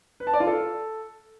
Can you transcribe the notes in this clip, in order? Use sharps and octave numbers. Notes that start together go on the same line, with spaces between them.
B4
A5
D5
F4
A4